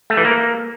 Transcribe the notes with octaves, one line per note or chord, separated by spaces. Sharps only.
A3
E3
A#3